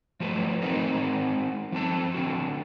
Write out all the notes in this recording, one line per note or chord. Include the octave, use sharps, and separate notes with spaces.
F3 F#3 A3 B4
G#3 C4 C#4 D#4 F#4 A#4
F3 C4 A5
D3 C4 F#4